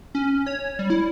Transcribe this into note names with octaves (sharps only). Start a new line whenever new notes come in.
C#4
C#5
G3
E4